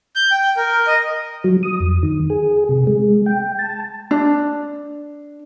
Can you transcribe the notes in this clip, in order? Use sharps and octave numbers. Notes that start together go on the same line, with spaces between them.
G6
G5
A#4
D#5
F#3
D#6
F2
D#3
G#4
C3
G#3
G5
A5
D4